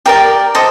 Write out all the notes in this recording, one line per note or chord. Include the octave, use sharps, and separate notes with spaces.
G4 A#4 D5 G5
A4 C5 D#5